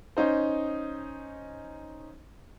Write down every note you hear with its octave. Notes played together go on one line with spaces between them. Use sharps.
C#4 D#4 C5